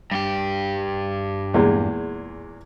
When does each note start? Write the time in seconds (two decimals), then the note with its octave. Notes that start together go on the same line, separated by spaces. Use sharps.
0.11 G2 G4
1.54 E2 A#2 G#3